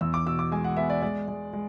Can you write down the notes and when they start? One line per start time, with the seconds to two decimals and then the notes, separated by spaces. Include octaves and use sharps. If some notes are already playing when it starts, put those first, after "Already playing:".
0.01 E2 E6
0.14 D6
0.26 B2 E6
0.39 D6
0.52 G#3 G#5
0.64 F#5
0.77 B3 E5
0.90 D5
1.02 G#3 D5
1.28 G#3
1.53 G#3